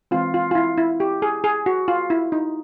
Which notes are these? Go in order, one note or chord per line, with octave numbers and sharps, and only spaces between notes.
E3 G#3 C4 F4
F4
F4
E4
E4
G4
G#4
G#4
F#4
F4
E4
D#4